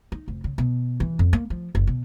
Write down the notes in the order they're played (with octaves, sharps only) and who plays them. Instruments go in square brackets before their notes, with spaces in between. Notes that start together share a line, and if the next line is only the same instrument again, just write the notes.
[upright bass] D#4
F1
C#3
B2
E3
F2
A#3
F3
F#1
B2